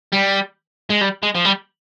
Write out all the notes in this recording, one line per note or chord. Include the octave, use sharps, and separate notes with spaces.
G3
G#3
G3
G#3
F3
G3